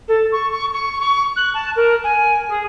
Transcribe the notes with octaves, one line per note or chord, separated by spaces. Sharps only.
A4
C#6
C#6
C#6
C#6
F#6
A5
A#4
G#5
G#4